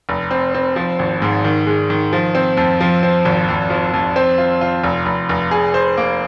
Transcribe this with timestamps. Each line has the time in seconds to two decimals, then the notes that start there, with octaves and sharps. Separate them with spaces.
0.09 F1
0.31 C4
0.55 C4
0.76 F3
0.99 G#1
1.22 G#2
1.44 D#3
1.67 G#3
1.90 D#3
2.13 F3
2.35 C4
2.57 F2
2.81 F3
3.03 C4
3.25 G#1
3.49 F2
3.70 F3
3.94 F2
4.16 C4
4.38 F4
4.61 F4
4.84 F1
5.06 F1
5.29 F1
5.51 G#4
5.74 C5
5.98 A#3